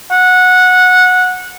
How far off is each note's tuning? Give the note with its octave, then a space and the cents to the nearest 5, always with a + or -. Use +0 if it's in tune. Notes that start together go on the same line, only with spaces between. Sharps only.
F#5 -15